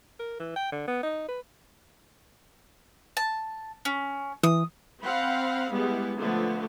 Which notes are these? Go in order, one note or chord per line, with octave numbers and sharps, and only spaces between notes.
A#4
E3
G5
D3
B3
D#4
B4
A5
C#4
E3 D#6
C4 F5 F#5 B5
G3 G#3 B3 E4
D3 F3 A3 B3